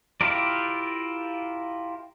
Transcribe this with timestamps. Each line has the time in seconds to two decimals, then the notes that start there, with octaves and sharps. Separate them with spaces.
0.21 E4 F4 G4 A#4 D5